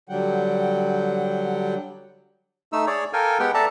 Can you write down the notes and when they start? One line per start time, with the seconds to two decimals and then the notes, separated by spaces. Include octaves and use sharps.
0.09 D3 F#3 G3 F#5 G5
2.72 A3 D#4 E6
2.87 G#4 C#5 D5
3.13 A4 A#4 F5 G5 G#5
3.39 G#3 B3 G4 F#5 G5
3.54 A4 D5 E5 A5 A#5